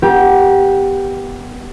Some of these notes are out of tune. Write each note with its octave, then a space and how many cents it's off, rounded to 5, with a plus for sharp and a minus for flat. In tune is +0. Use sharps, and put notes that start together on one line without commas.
B3 +0 G4 +0 A#4 +45